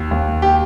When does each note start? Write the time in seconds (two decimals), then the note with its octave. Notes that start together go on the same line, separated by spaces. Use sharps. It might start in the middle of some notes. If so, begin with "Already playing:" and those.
Already playing: D#2
0.11 D#2
0.42 G4